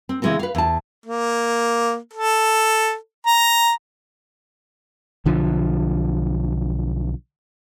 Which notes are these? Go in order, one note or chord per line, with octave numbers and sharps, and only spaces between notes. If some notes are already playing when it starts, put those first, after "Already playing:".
C4
C#3 E3 G#3 B3 C4
B4 F5
E2 A5
A#3
A4
A#5
B1 D3 F3